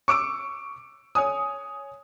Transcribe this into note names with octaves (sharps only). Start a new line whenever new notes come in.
C#6 D6 E6 D7
C#5 G#5 D#6